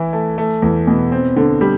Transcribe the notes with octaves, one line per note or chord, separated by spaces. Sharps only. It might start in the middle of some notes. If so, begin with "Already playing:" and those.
Already playing: E3 E4
A3
A3
E2
B2
C4
D3
G3